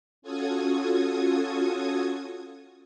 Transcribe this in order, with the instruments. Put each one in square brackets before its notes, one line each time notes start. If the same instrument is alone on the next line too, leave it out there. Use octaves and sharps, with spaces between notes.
[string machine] C#4 F4 F#4 A4 D#6 G#6